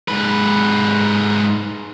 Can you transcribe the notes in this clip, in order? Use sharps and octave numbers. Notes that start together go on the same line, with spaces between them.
G#2 B4